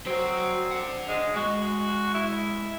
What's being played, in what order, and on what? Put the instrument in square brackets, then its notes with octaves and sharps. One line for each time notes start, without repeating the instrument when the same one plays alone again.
[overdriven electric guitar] F#3 F#4 [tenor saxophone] C4
[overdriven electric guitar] D4 F#5
[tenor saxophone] G#3
[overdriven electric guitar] G#3 [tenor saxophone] F#4
[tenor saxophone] E4